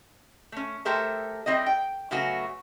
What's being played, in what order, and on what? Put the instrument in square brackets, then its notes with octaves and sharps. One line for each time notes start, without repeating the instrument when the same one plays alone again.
[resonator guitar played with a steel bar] A3 C#4
A3 G4 A4 A#4 C5 E5
G3 C4 E4 D#5
G5
C#3 F#3 A3 B3 C#4 F#4